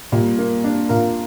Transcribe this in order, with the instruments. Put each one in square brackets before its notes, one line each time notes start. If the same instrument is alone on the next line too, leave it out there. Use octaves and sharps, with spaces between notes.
[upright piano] A#2 [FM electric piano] G3
[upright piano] A#3
D4
[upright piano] A#2 [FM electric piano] F4 A#4